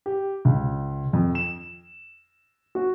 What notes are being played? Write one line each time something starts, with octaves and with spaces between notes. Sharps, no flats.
G4
C#2
F2
E7
F#4